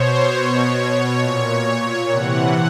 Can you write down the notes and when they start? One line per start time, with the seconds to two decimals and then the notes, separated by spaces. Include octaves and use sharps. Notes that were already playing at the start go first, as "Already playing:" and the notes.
Already playing: B2 C5 C#5
0.33 B2 C#5
1.22 A#2
2.11 C3 E3 F#5